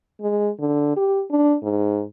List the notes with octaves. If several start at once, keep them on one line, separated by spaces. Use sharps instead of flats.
G#3
D3
G4
D4
G#2